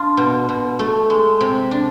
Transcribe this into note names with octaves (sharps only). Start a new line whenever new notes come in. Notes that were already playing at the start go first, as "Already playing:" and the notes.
Already playing: D4 F4
B2
B2
A3
G#3
C3
D4